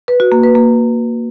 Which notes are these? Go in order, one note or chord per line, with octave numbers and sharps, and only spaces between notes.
B4
F#4
A#3
B4
A#3